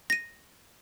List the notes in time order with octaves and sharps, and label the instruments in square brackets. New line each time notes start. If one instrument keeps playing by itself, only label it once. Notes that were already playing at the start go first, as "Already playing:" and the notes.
[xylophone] A#6 D#7